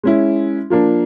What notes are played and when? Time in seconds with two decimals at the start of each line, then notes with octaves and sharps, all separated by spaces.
0.03 G#3 C#4 E4
0.70 F3 A#3 D4